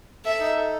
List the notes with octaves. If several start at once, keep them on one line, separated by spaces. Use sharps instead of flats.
A4 E5
D#4
A4